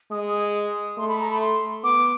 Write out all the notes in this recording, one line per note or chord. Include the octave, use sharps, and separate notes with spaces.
G#3 D#6
A3 C6
B5
A#5
B5
C6
B3 D6